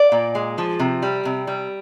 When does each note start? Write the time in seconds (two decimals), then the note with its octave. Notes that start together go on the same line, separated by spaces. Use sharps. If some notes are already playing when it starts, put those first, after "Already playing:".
Already playing: D5
0.12 A#2
0.35 G#3
0.58 F3
0.80 C3
1.03 G3
1.25 C3
1.47 G3